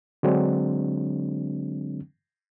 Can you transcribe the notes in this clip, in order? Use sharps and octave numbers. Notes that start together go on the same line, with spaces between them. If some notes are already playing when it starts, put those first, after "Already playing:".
D3 F#3 G#3 C4 D4